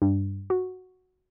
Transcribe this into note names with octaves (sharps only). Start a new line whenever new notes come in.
G2
F#4